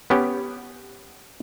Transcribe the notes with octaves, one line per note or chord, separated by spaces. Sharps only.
B3 C#4 G4